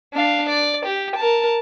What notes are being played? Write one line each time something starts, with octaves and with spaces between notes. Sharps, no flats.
D4 F5
D5
G4
A#4 A5